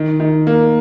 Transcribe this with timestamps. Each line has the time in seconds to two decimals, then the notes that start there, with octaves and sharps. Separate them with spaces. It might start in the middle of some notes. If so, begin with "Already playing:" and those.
Already playing: D#3
0.20 D#3
0.47 A#3